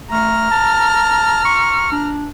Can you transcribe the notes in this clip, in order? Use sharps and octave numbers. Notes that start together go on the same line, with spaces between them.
A3 A#5 F6
A5
C#6
D4